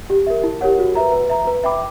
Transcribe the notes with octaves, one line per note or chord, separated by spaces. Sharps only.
G4
A#4 E5
E4
G4 A#4 C#5 F#5
F#4
B4 E5 A#5
B4
E5 A#5
B4
E5 G5 B5 D6